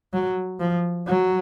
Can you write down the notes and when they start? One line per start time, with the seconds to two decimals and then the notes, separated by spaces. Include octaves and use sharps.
0.13 F#3
0.59 F3
1.07 F#3